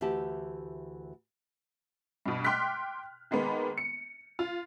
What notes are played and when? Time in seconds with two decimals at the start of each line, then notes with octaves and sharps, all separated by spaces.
0.01 D2 E3 E4 G4 A5
2.26 G2 B2
2.44 G5 C6 D6 F6 F#6 B6
3.31 D#3 G#3 A#3 B3
3.78 C#7
4.39 F4